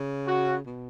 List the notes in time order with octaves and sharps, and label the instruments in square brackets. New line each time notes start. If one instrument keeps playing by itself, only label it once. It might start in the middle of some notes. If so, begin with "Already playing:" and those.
Already playing: [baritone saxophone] C#3
[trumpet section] F#4
[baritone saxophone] B2